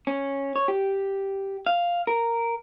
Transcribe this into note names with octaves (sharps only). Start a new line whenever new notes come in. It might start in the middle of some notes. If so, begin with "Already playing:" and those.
C#4
C#5
G4
F5
A#4